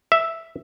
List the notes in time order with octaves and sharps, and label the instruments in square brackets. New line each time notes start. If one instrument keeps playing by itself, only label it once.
[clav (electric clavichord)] E5